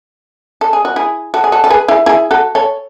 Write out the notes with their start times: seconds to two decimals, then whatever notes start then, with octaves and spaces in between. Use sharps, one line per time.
0.61 A4
0.73 G#4
0.85 F#4
0.96 E4 G#4
1.34 F#4 A4
1.44 G#4
1.52 F#4 A4
1.64 A4
1.70 G#4 B4
1.88 E4 G#4
2.06 E4 G#4
2.31 F#4 A4
2.55 A4 C#5